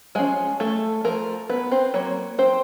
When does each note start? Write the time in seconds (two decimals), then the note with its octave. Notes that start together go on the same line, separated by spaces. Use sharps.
0.15 F3 G#3 C#4 G#4
0.60 A3 A4
1.05 F3 A3 A#4
1.49 B3 B4
1.71 C4 C5
1.94 F#3 A#3 C#5
2.38 C4 C5